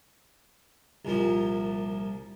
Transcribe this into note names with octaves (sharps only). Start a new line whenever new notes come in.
C2 A#2 F3